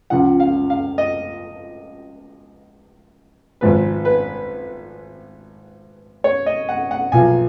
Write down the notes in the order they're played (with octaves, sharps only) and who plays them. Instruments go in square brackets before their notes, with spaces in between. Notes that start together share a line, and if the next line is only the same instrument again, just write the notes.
[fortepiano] C#2 C#3 F3 F#5
F5
F5
D#5
G#1 G#2 F3 B4
B4
C#5
D#5
F#5
F#5
B1 A#2 F3 G#5